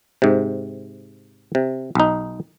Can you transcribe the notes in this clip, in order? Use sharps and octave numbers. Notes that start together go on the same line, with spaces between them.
G#2 C3
C3
B1 D#4